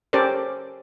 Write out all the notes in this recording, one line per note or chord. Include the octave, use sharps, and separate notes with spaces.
C#4 G4 A4 A#4 C5 D5